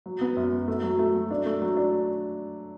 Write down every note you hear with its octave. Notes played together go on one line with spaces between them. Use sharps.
F#3
B3
F#2
F#3
A3
F#3
A3
F#3
D4
A3
F#3
D4